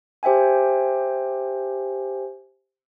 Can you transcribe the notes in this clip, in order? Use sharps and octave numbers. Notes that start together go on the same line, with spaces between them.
G4 C5 E5 G5 G#5